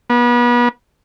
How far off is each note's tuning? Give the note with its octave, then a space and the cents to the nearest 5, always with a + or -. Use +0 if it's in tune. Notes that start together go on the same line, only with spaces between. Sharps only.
B3 -35